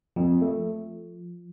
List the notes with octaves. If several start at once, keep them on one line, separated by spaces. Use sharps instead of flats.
F2 F3
A3